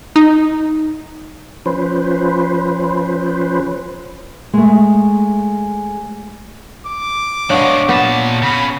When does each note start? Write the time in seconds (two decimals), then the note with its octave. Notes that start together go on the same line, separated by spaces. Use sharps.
0.16 D#4
1.66 F3 C#4 B4 C5
4.53 G#3 A3
6.86 D6
7.50 B2 G#3 B3 D4 C#5 F5 C#6
7.89 A#2 B3 A5
8.42 C#3 B5